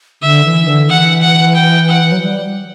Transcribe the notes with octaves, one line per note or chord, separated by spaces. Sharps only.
D3 E5
E3
D3
E3 F#5
F#5
G5
F#5
F#3
G3